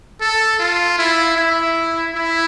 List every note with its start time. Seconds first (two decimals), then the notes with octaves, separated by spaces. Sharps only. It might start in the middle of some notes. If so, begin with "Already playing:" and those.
0.21 A4
0.59 F4
0.99 E4
1.36 E4
2.15 E4